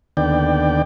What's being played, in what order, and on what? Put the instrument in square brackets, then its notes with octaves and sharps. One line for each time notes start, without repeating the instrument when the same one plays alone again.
[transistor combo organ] D#2 D3 B3 D5 G5